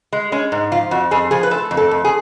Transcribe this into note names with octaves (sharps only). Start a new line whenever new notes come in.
G#3
G#3 C#4
G#2
F3 F4
F2 F#4
F2 G#4
F3 G#4
B4
A3 A4
F2
A4
F2
G#4